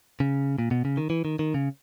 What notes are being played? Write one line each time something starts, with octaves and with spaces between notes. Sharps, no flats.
C#3
A#2
B2
C#3
D#3
E3
D#3
D#3
C#3